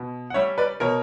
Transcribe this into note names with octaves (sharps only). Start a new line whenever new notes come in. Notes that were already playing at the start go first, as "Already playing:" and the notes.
Already playing: B2
F#5
G3 C#4 C#5 E5
B4 D5
B2 A#4 C#5